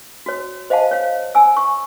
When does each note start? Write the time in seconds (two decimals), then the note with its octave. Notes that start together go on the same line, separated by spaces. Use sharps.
0.26 F#4 C#5
0.70 C5 D#5 F5 F#5 A5
0.91 C#5 F5
1.35 G#5 E6
1.57 C#6